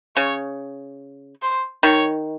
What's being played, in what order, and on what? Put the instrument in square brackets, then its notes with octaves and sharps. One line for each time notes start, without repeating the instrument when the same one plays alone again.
[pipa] C#3 [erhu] C#5
[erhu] C5
[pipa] D#3 [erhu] C#5